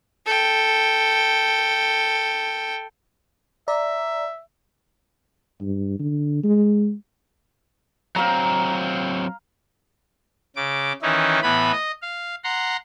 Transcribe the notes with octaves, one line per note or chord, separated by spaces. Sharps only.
A4 G5
D5 E5 A#5
G2
D3
G#3
F#3 C4 F5 A#5
C#3 D6
D#3 E3 C#4 D#4 E4
A2 E3 B3 B5
D#5
F5
F#5 A#5 C6